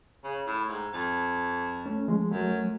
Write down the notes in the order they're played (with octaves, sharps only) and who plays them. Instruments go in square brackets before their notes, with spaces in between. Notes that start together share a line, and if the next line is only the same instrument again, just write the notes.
[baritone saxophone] C#3
A2
G#2
F2
[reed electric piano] A3 C#4
F3 G#3
[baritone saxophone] F#2 [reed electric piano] F#3 A3